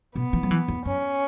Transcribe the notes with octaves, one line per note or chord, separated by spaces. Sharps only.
B2 B3
E3
F#3
E3
E2
F#2 C#4